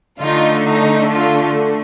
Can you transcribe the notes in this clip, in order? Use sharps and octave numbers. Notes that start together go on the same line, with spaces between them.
D3 A3 D#4 F4
D#4
F4